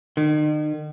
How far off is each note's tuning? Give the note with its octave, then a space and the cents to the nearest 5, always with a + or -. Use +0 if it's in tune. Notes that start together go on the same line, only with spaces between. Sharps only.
D#3 -40